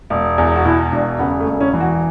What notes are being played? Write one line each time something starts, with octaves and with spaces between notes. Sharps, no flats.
E1
E2
F#4
B2 E4
E1 D4
C#3 B3
A3
E1
C#4
E3
F#4